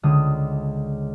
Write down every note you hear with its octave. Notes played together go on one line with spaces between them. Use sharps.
C#2 D3 D#6